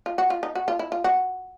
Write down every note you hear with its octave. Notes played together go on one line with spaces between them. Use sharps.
F4
F#4
F4
D#4
F#4
F4
E4
F4
F#4